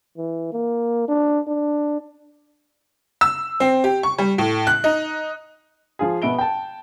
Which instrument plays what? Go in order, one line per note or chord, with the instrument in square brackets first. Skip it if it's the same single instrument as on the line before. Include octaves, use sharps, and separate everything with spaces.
[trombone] E3
A#3
D4
D4
[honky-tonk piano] E6
C4
G4
C#6
G3
A2
F#6
D#4
[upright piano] F3 F4 G#4
B2 B3 E5 D7 G7
G5 A5